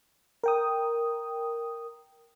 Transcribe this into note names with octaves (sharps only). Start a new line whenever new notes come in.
A#4 G5 D#6